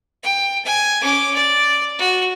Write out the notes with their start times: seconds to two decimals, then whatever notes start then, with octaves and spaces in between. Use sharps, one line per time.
0.23 G5
0.65 G#5
1.02 C#4 D6
1.34 D5
1.99 F#4